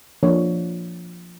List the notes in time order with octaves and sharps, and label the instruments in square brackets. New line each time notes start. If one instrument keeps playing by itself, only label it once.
[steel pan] F3 A#3 D4 C#5